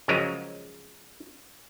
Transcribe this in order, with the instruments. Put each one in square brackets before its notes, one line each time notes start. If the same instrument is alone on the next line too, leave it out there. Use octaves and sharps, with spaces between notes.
[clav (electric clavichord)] C#3 F3 F#3 G#3 A#4